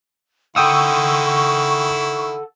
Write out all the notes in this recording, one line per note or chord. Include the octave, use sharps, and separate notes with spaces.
D#3 E4 A4 F#5 G5 C#6 D#6 E6